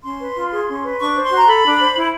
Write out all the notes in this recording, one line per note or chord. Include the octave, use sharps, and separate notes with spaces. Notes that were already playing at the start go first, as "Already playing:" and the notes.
C#4 C6
B4
F4
G#4
C#4
B4
D4 C#6
C5
C6
F#4
A#5
A4 B5
D4
C5
E4